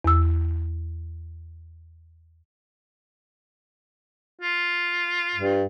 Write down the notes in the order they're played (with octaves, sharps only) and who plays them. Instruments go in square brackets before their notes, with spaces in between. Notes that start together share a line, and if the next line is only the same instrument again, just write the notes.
[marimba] E2 E6
[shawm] F4
[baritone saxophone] G2